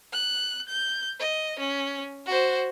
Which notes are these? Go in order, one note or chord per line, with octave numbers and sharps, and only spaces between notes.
F#6
G6
D#5
C#4
F#4 C5